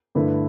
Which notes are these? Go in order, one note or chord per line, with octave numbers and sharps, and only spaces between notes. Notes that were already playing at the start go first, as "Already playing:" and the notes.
G2 D3 A3 E4 B4